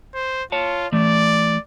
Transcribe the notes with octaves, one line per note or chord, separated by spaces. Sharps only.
C5
F4 C#5 A5
E3 A3 D5